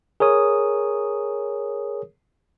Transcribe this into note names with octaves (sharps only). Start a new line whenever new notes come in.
G#4 A#4 C#5 D#6